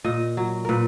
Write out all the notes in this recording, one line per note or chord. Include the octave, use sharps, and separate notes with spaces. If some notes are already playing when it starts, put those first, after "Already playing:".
A#2 D#5
F#3
A#2 A#4 B4